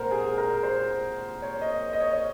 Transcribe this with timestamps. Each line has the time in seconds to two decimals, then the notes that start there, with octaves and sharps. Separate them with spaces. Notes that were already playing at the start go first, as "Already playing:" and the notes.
Already playing: A#2 G#3 C4 A#4 C5 F#5
0.11 G#4
0.38 A#4
0.63 C5
1.42 C#5
1.62 D#5
1.93 D#5
2.00 C#5
2.13 D#5